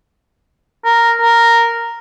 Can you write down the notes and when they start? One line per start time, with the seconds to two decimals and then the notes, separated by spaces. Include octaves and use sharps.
0.85 A#4
1.21 A#4